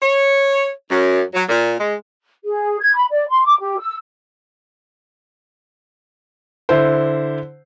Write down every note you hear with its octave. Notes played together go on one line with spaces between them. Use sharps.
C#5
F#2
F#3
A#2
G#3
G#4
G#6
B5
D5
C6
D6
G4
E6
D3 E4 C5